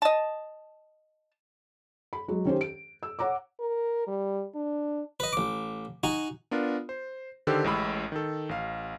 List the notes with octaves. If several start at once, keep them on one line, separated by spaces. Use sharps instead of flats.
D#5 A5
B5
F#3 G#3
D#3 C#4 G4 C5
D7
E6
C#5 F#5 A#5 D6
A#4
G3
D4
B4 D#5
A1 D6
D#4 F#4 G#5
B3 D4 F4 A#4
C5
D3 D#3 G4 A4 C5
A1 A2 G#3 B5 E6
D#3 A4
A1 F5